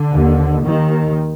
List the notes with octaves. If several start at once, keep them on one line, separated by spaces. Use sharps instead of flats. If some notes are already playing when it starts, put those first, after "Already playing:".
Already playing: D3
D#2
D#2 D#3